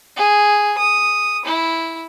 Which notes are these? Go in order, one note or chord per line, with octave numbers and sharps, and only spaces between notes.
G#4
D#6
E4